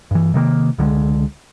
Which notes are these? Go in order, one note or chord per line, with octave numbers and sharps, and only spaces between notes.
G2 E3
C3 D#3 G3 A#3
C#2 D3 F#3 G#3